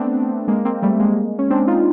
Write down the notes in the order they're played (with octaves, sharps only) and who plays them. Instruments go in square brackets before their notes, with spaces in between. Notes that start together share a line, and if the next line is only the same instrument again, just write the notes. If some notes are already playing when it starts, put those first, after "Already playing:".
Already playing: [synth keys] A3 B3 C4 D4
G#3 A#3
A#3 C4
G3 A3
G#3 A#3
C#4
C4 D4
D#4 F4